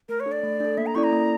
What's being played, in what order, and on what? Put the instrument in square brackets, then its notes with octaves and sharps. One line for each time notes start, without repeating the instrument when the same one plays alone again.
[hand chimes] A3 [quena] A#4
[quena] C#5
[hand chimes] D4 A4
[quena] D5
[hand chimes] A3
D4 A4
[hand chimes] A#3 [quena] E5
[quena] A#5
[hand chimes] C#4 E4 A4 D5 [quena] C#6
[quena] A#5
[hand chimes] A#3